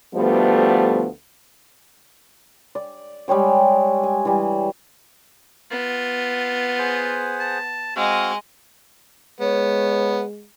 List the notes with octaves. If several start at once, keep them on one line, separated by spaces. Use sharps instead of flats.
D2 F3 G3 A3 B3
D5
G3 G#3 C#5 G5
G#5
E3 G3
B3 F4
G#4 C5 F#5
A5
G#3 C4 F#4 D#5 F5
G#3 B3 C#5